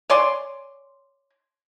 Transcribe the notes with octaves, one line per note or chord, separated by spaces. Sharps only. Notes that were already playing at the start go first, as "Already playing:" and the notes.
C#5 D5 G#5 C6